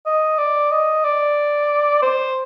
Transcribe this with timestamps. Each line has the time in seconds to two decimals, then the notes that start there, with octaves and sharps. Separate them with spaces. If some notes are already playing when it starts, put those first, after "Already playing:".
0.06 D#5
0.38 D5
0.71 D#5
1.04 D5
2.03 C5